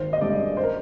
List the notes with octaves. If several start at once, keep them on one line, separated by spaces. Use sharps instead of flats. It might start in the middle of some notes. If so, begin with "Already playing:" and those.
Already playing: G#1 C5
D#5
G2 D3 G#3 D5
C5
A#4